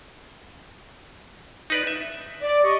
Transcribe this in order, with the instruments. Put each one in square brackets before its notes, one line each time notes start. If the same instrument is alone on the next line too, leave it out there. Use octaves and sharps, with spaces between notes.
[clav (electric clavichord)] D#4 B4 D5
E5
[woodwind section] D5
G4 D#5 C#6